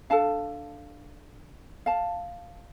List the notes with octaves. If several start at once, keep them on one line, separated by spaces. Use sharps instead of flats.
D4 A4 F5 A5
F5 A5